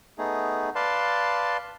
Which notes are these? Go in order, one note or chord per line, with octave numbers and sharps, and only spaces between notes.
A3 B3 D#4 G#4
B4 D5 F5 A5 C6